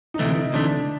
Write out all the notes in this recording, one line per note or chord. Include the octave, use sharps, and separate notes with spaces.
D#4
D2 C3 E3 A3 E4
D#4
D2 C3 E3 A3 D4